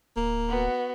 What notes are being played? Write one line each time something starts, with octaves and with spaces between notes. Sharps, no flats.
D1 A#3
B3 F#4